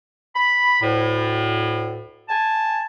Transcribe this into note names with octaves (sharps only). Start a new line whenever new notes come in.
B5
D2 A2
G#5 A5